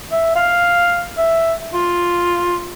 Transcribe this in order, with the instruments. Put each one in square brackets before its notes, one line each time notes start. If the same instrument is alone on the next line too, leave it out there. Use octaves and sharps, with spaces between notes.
[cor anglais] E5
F5
E5
F4